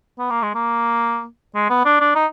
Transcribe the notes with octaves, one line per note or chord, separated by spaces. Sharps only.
B3
A#3
G#3
A#3
G#3
B3
D4
D4
D#4